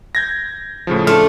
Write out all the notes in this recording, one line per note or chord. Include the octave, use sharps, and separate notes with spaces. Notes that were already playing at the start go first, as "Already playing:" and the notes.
G6 G#6 A#6
A2 C#3 F3
A3 D4 F4 F6